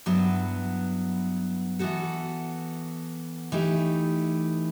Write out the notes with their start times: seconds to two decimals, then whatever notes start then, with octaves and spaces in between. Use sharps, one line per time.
0.06 G2 F#3 B3 E4 B4
1.79 E3 B3 F#4 A4
3.52 E3 A3 D#4 G4